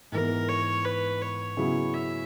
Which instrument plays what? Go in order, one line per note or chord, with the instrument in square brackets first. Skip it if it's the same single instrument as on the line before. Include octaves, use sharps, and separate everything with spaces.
[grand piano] G#2 E3 B3 [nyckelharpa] A#4
[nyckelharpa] C#5
B4
C#5
[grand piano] C#3 F#3 B3 E4 G#4
[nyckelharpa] E5